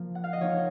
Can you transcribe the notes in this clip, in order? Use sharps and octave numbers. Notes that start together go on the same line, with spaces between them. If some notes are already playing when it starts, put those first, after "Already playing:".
Already playing: F3 A#3
F#5
F5
D#5
F3 A#3 D#4 C#5